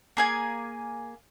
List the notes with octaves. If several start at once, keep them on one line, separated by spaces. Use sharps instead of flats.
A#3 G#4 G#5